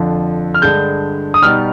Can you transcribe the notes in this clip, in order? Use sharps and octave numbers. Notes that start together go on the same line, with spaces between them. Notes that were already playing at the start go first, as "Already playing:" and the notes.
Already playing: F2 D3 F3
F6
G2 D3 G#3 G6
D#6
B2 G3 B3 D#4 F6